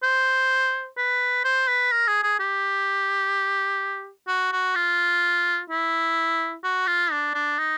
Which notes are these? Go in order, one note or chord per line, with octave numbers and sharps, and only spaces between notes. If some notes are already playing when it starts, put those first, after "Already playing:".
C5
B4
C5
B4
A#4
G#4
G#4
G4
F#4
F#4
F4
E4
F#4
F4
D4
D4
D#4